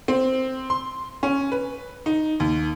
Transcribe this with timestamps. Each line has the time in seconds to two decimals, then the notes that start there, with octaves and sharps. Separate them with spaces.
0.08 C4
0.70 C6
1.23 C#4
1.52 B4
2.06 D#4
2.40 D#2